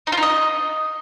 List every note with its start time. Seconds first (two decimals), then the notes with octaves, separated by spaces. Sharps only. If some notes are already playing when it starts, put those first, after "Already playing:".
0.07 D#4
0.12 F4
0.17 D#4
0.23 D#5